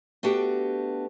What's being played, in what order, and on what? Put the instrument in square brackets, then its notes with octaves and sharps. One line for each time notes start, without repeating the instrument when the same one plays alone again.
[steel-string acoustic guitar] A3 B3 D4 F#4 G4